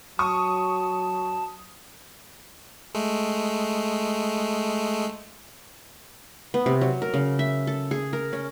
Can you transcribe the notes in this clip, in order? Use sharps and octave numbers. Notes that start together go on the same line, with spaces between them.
F#3 A5 C#6 D#6
G#3 A3
B3
C3
F#3
A#4
C#3
E5
A4
G#4
A#4
C#4